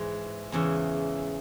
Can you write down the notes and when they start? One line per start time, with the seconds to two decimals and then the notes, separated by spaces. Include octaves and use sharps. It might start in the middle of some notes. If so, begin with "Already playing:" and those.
Already playing: G#2 E3 G#3
0.52 E2 C#3 E3